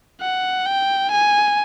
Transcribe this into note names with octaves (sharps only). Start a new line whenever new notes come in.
F#5
G5
G#5